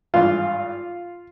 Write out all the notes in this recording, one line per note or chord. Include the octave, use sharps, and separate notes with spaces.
G#1 G2 E3 F4